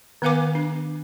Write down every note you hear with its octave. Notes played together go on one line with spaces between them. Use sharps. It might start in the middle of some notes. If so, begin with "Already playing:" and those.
D#3 B3 B4 F5 G#5 D6
D4